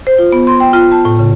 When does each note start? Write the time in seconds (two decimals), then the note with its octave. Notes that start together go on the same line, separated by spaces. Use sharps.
0.07 C5
0.19 F4
0.33 B3
0.47 C6
0.60 G5
0.73 F4
0.92 A5
1.05 A2
1.19 C#3